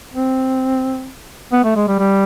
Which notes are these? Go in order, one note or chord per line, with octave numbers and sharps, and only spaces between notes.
C4
B3
A3
G#3
G3
G3